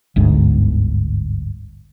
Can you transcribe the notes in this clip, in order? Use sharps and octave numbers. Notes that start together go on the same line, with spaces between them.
G1 D2 G#2